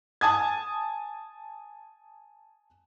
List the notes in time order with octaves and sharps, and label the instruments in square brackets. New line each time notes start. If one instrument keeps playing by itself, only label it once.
[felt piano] G#5 A5 D#6 G#6